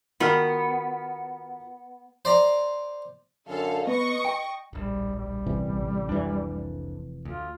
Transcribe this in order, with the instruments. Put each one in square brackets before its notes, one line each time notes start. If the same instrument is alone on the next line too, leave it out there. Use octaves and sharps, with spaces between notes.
[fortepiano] D#3 A#4 F6 [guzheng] B3 [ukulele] F4 F#4 B5
[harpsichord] C5 D5 A#5
[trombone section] F#2 D3 [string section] A4 F5
[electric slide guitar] B3 [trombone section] B4 [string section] D#5 C#6
[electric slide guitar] G5
[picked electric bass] D1 A#1 [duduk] G3
[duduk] G3
[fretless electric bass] A1 C3 E3
[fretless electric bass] F1 E3 [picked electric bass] C2 F2 D4
[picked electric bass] D2 [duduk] F4